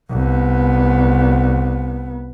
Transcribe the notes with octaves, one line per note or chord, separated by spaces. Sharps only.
C2 B3